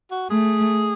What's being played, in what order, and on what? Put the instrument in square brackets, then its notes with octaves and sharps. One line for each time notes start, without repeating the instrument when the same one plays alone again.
[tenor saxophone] F#4
[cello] A3 [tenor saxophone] G#4